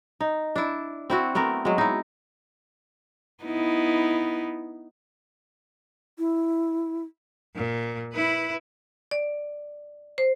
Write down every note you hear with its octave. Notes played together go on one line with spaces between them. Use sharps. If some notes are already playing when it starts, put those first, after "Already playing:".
D#4
D4 E4
C4 E4 F#4
A3 B3 C4 A#4
F#3 G#3
D#4 E4
B3 D#4 E4
E4
A#2
E4 B4
D5
C5